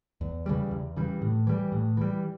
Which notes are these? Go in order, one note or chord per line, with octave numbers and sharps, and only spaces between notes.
E2
C#3 E3 G3
E2
C#3 E3 G3
A2
E3 G3
A2
E3 G3